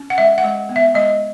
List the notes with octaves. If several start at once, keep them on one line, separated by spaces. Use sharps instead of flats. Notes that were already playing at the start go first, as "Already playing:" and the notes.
Already playing: C#4
F#5
G#3 E5
F#5
G#3
B3
E5
G#3 D#5